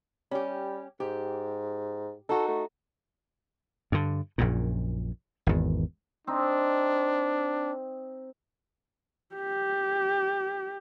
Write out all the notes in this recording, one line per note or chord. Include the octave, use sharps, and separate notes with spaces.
G3 C#4 G4
G#2 G4
D#4 F#4 A4
A3
G2 D3
A#1 F#2 A#2
G#1 E2
C4 D4 D#4
G4